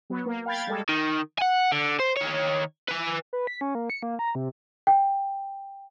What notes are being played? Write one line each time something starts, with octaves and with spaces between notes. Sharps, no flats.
F#3 B3
A#3
F5 G5 B5 G#6 A6
G3 G#3 A4
D#3
F#5 G#5
D3
C5
D#3 C#5
B4 G#5
B4
B6
C#4
A#3
C#7
A#3
A#5
C3
G5